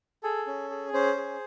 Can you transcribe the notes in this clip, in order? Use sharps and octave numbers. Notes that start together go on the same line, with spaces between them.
G#4 A4
C#4
G#4
C#4 C5
G#4